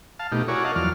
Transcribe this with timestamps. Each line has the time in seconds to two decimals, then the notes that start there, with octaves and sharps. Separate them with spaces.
0.19 F5 A5
0.32 B2 A3 D#4 G4
0.48 E4 F#4 G#4 A#4 C#5 D5
0.64 A#4 D#5 F5 F#5 A5
0.76 E2 F3 F#3 D5 F6